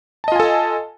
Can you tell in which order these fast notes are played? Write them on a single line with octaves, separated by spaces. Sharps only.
A5 D#5 F4 G#5 A4